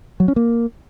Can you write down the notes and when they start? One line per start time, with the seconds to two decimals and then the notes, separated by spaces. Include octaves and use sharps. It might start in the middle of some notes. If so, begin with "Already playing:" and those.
0.20 F#3
0.28 C#4
0.36 A#3